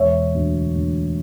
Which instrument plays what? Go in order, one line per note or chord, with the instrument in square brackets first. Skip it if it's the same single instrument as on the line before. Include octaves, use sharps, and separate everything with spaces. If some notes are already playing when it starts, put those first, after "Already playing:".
Already playing: [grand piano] E1 C#5 E5
D2
D2